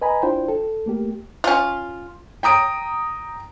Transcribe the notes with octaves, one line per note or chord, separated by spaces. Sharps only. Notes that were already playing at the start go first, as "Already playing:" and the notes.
B4 D#5 G#5 A#5 B5
D4 E4 F4 C5 G5
A4
A3 A#3 G4
C#4 F4
G5 A#5 D#6 D7